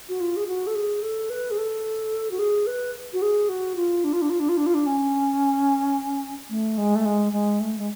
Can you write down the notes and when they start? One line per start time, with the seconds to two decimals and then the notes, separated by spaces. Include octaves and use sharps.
0.09 F#4
0.20 F4
0.36 G#4
0.47 F#4
0.67 A4
0.74 G#4
1.02 A4
1.30 B4
1.51 G#4
1.58 A4
2.31 F#4
2.39 G#4
2.67 B4
3.13 F#4
3.22 G#4
3.49 F#4
3.76 F4
4.04 D4
4.13 F4
4.22 D4
4.30 F4
4.40 D4
4.49 F4
4.57 D4
4.66 F4
4.74 D4
4.86 C#4
6.50 A3
6.78 G#3
6.95 A3
7.05 G#3
7.32 G#3
7.60 A3
7.78 G#3